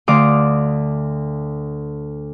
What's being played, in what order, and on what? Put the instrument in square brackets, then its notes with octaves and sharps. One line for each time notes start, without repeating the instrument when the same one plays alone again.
[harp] D2 D3 F5 C6 D6 D#6